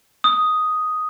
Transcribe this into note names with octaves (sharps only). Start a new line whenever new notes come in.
D#6